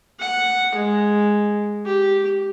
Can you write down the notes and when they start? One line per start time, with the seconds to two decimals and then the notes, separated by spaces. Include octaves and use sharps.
0.20 F#5
0.75 G#3
1.86 G4